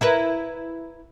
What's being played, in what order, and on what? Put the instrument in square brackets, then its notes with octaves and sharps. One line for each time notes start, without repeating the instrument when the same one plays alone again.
[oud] E4 A#4 B4